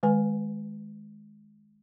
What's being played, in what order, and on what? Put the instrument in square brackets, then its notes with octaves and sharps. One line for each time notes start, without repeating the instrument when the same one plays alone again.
[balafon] D#3 G#3 B4 G#5